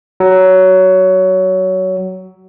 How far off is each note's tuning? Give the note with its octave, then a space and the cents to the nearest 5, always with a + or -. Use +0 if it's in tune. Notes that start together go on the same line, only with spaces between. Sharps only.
F#3 +15